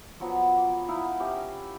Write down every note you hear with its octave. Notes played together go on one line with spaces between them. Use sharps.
F3 F#3 B3 A#5
D6
D#4 E4 F5 F#5
C#4 G4 E5
A#5